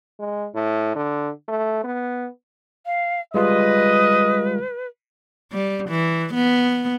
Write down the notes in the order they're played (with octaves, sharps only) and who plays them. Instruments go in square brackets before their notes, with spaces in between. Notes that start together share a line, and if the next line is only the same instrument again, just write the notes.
[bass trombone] G#3
A2
D3
A3
B3
[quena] F5
[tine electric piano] G3 G#3 F4 [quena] B4 [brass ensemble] D#5
[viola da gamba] G3
E3
B3